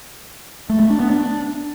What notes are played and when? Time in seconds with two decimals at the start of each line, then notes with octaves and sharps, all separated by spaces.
0.70 A3
0.80 A3
0.90 D4
1.00 B3
1.10 D4